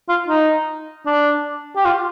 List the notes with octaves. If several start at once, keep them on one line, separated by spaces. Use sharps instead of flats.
F4
D#4
D4
G4
F4